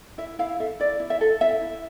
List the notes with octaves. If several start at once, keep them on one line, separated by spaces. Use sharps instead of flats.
E4 E5
E4 F5
A4 E5
E4 D5
E4
E5
A4
E4 E5
E4